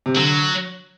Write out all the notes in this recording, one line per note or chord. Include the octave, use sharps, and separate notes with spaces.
C3
D3 F#3